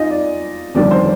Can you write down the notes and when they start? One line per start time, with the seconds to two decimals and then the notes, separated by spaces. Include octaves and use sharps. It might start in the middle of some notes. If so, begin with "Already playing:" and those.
Already playing: D#4 F4 G#4 D#5 G#5
0.10 D5
0.75 G1 F2 D#3 G3 D4 D5
0.91 C5